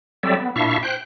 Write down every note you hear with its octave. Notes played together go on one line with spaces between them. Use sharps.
F#3 G3 C4 A4 D5 E5
B3
A#2 D4 E4 E5 F5 C#6
C5 G5 F#6